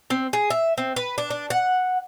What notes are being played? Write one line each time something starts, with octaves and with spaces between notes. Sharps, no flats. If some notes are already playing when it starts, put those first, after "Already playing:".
C4
G#4
E5
C4
B4
D4
D4
F#5